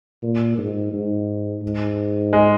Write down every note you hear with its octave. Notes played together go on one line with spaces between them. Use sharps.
A#2
G#2
G#2
G#2
G#3